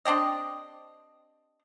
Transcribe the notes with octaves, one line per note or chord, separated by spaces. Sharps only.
C4 D4 G4 D#5